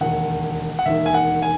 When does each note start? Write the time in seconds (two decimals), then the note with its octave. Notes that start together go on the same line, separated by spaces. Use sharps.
0.01 E1 D#2 D#3 F#5
0.79 F#5
0.86 E1 D#2 D#3 E5
1.06 G#5
1.14 F#5
1.42 G#5